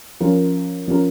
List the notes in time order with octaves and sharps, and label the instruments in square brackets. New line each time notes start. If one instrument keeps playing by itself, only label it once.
[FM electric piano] F3 C#4 F4 A#4
F3 C#4 F4 A#4